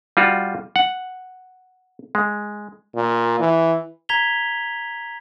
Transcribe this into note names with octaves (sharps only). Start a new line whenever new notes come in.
G3 F4 F#4
F#5
G#3
A#2
E3
A#5 G#6 B6 F7 G7